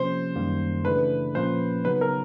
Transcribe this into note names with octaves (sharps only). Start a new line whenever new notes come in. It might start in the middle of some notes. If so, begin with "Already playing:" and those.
Already playing: C3 F3 A#3 C#4 C5
F#2 D#3 G3 A#3
C#3 E3 A3 D4 B4
A#2 F3 A#3 C#4 C5
C#3 F#3 B3 D#4 B4
A#4